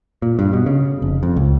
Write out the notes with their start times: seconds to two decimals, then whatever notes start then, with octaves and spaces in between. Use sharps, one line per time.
0.22 A#2
0.39 G2
0.53 B2
0.66 C#3
1.02 F1
1.23 F2
1.36 C#2